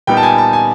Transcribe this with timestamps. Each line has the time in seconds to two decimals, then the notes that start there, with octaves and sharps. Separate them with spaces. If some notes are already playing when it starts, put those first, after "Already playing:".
0.07 A#2 G3 B3 D#4 G5
0.17 A5
0.23 G#5
0.38 A5
0.53 G#5